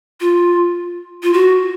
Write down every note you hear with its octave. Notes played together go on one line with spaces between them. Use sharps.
F4
F4
F#4